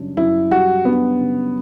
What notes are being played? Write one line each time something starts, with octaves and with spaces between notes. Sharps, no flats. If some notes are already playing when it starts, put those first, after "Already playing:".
Already playing: F#2 C#3 G3 D4
F#2 E4
G3 F#4
B3 D4
C#3